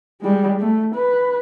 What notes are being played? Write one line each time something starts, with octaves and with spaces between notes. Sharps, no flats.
G3 G#3
A3
B4